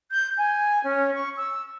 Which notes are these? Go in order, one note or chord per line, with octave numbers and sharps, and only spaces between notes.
G6
G#5
C#4
C#6
E6